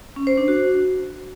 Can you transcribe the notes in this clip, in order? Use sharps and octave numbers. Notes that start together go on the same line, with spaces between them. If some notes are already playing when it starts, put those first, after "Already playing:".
C#4
C5
D4
F#4